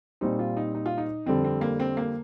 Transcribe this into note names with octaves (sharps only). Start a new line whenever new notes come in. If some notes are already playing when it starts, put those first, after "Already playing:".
A#2 G3 C4 D#4
F4
D#4
D#4
F4
D#4
F2 D3 G3 C4
C4
A#3
C4
A#3